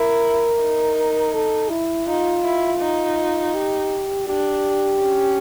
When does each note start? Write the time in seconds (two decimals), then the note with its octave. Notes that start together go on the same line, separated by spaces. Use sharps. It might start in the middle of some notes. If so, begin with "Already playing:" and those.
Already playing: E4 A#4
0.60 D#4
1.34 A4
1.70 E4
2.07 D#4 F4
2.44 E4
2.80 D#4
3.55 G4
4.28 D4 G4
5.01 C#4